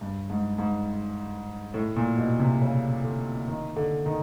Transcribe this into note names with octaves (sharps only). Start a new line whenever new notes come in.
G2
G#2
G#2
A2
A#2
B2
C3
C#3
D3
D#3
D3
D#3